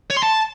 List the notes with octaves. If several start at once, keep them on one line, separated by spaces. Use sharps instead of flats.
C#5
C6
A5